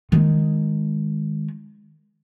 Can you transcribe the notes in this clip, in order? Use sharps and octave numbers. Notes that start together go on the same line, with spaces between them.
D#3 G#3